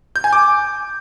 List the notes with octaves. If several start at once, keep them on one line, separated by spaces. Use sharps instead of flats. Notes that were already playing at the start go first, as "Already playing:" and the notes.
G6
G#5
D6